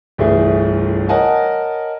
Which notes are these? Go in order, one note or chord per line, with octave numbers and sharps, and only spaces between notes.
G1 C2 E3 A3 G#4
A#4 C#5 D#5 F#5 G#5 A5